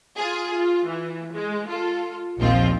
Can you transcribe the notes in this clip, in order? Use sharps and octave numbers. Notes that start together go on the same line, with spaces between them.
F4 G#4
F4
E3
G#3
F4 A4
A#1 D#2 F3 C4 F4